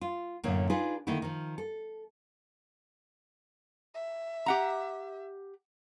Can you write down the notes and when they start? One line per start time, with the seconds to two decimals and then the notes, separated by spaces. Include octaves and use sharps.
0.01 F4
0.44 F#2 A2 D3 A#3
0.70 D4 D#4 F4 G#4 B4
1.07 D3 D#3 A3 A#3 D#4 E4
1.22 D#3 F3
1.58 A4
3.95 E5
4.46 G4 F#5 A#5